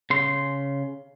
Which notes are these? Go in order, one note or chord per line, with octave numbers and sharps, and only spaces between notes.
C#3 C6